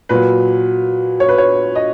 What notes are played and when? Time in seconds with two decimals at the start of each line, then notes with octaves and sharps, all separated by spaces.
0.09 A#2 F#3 B4
1.20 C#5
1.29 B4
1.38 C#5
1.75 D#5